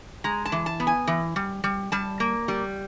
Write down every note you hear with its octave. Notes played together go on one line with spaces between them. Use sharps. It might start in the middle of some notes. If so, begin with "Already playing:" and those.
G#3 A#5
A5
E3
A5
B3
G#5
E3
G3
G3
G3 A5
A#3
G3